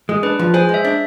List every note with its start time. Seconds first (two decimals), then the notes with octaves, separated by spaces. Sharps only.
0.09 G#3
0.23 D4 B4
0.39 F3
0.54 G#4 C5
0.69 G#3
0.74 E5
0.84 D4